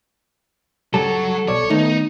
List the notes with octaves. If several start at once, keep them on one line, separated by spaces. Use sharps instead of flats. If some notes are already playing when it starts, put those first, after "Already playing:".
D2 G2 C#3 F#3 G3 A4
B1 C#5 D5
D#3 A3 B3 D#4